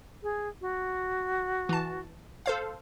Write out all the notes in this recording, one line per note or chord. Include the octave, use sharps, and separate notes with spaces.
G#4
F#4
E3 A5
A4 C5 F5